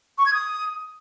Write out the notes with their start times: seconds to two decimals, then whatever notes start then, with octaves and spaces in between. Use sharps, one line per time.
0.18 C#6
0.26 G#6
0.34 D#6